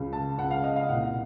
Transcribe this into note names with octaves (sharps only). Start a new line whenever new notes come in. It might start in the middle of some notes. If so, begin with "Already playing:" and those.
Already playing: C#2 C#3
A5
C#2 C#3 F#5
F5
D#5
F5
C2 A#2 F#5